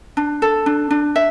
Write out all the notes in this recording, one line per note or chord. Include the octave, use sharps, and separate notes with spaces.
D4
A4
D4
D4
E5